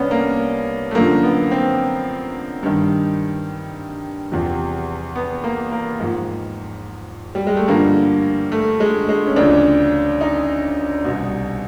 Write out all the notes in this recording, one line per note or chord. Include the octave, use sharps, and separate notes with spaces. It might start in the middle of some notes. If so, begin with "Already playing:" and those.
Already playing: C2 B3 C#4 D4
A#3
A3
F#2 D3 F3 A#3
B3
C4
G2 D#3
E2 C3 F3
B3
A#3
A#3
G#2 F3
G3
G#3
A3
G2 D3 F3 A#3
A3
G#3
G#3
C#4
D2 C#3 F3 D4
D#4
C2 B2